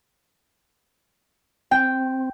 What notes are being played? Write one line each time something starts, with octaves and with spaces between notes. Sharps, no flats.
C4 G5